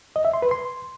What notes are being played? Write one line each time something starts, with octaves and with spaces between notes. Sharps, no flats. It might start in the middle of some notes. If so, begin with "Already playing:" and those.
D#5
E5
C6
B4
C6